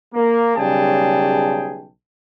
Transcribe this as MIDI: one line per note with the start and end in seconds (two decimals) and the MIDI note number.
0.14 0.53 58
0.56 1.88 35
0.56 1.88 49
0.56 1.88 55
0.56 1.88 68
0.56 1.88 79
0.56 1.88 81